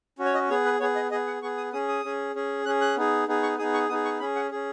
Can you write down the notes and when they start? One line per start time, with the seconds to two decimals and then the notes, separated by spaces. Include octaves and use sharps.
0.19 C#4 F#4
0.25 C#5
0.34 D#5
0.49 B3 G#4 C#5
0.65 B4
0.80 B3 G#4 C#5
0.95 D#5
1.11 B3 G#4 D#5
1.27 F#5
1.42 B3 G#4 C#6
1.57 D#6
1.73 C#4 G#4 D#6
1.88 D#6
2.04 C#4 G#4
2.35 C#4 G#4
2.66 C#4 F#6
2.69 G#4
2.81 F#6
2.96 B3 D#4 G#4
3.28 B3 D#4 G#4
3.43 C#6
3.58 B3 D#4 G#4 D#6
3.74 C#6
3.89 B3 D#4 G#4 D#6
4.05 C#6
4.20 C#4 G#4 B5
4.36 F#5
4.51 C#4 G#4